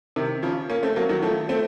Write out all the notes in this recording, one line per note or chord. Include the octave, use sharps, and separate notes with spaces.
C3 D#3
C#3 F3
A#3 C#4
A3 C4
F#3 A#3
D#3 F#3
F3 A3
A3 C4